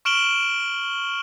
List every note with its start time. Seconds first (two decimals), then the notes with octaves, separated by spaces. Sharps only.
0.05 C#6 F6 D7 E7 F#7 G7